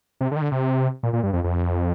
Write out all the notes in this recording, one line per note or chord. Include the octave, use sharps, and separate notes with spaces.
C3
D3
D#3
D3
C3
A#2
A#2
G2
F2
F2